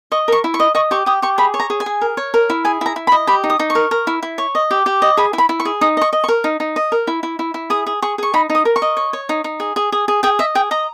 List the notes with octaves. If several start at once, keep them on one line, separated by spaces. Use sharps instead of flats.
D#5 C#6
A#4 C#6
E4
C#6
D#5
D#5 C#6
G4 C#6
G4 D#6
G4 C#6
G#4 B5
C#5
A#5
G#4
G#5
G#4
A#4
C#5
A#4
E4
G#4 G#5
E4 A#5
E4
B5
D#5
G4 B5
D#4
D#6
D#4
C#6
A#4
A#4
E4
E4
C#5
D#5
G4
G4
D#5
G#4 B5
E4
B5
E4
C#6
G#4
D#4 D#6
D#5 C#6
D#5
C#6
A#4
D#4
D#4
D#5
A#4
E4
E4
E4
E4
G#4 D#6
G#4
G#4 C#6
G#4 C#6
D#4 B5
D#4
D#6
A#4
C#6
D#5
C#5
C#5
D#4
D#4
G#4
G#4
G#4
G#4
G#4 G5
D#5 E5
G#4 G5
D#5 A#5